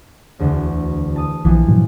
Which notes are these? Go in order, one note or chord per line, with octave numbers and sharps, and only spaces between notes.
E1 D2 D3
A5 D#6
A#1 E3 F3
G2 A#2 F#3